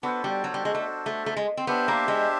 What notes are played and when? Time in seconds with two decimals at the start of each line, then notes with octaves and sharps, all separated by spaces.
0.03 B3 D4 F#4 A4 C5
0.24 G3
0.44 F#3
0.54 G3
0.65 G#3
0.75 A3
1.06 A3
1.26 A3
1.37 G#3
1.57 C4
1.67 B3 D4 G4 C5 E5
1.88 A#3
2.08 G#3